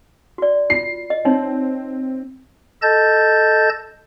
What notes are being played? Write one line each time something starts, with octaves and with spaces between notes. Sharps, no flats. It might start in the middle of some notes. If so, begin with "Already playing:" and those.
F#4 D5
F4 C7
D#5
C4 D#4 C#5
A4 D#5 A5 G6 A6